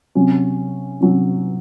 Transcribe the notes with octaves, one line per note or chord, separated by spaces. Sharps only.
C3 F#3 C#4
C3 F#3 C#4